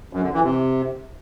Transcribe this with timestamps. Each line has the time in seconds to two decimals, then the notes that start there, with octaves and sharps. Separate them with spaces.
0.13 F#2
0.23 D3
0.33 E3
0.43 C3